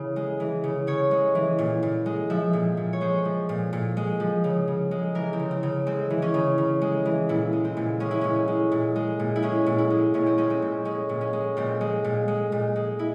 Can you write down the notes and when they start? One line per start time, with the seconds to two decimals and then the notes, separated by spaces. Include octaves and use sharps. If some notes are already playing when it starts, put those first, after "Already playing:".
Already playing: C#3 E3
0.16 G#3
0.40 E3
0.64 C#3
0.87 C#3 C#5
1.11 G#3
1.35 E3
1.59 A#2
1.83 A#2
2.06 G#3
2.30 F3 E5
2.53 A#2
2.77 A#2
2.93 C#5
3.01 G#3 C5
3.25 F3
3.49 A#2
3.73 A#2
3.97 G#3
4.20 F3
4.44 C#3
4.68 C#3
4.91 G#3
5.15 E3 A#4
5.33 C4
5.39 C#3
5.51 C4
5.63 C#3
5.86 G#3 C4
6.10 E3
6.22 C#4
6.34 C#3
6.58 C#3
6.81 G#3
7.05 E3
7.29 A#2 E4
7.53 G#3
7.65 C4
7.77 A#2
8.00 G#3 C#4
8.11 E4
8.21 A#2 C#4
8.48 G#3
8.72 A#2
8.96 G#3
9.19 A#2
9.36 E4
9.42 G#3 C#4
9.66 A#2
9.78 E4
9.90 G#3
10.14 A#2 C#4
10.26 C4
10.38 G#3 C#4
10.50 C4
10.62 A#2
10.85 G#3 C#4
11.09 A#2
11.21 C#4
11.33 G#3
11.57 A#2 C4
11.81 G#3
12.04 A#2
12.28 G#3
12.52 A#2
12.76 G#3
12.99 E4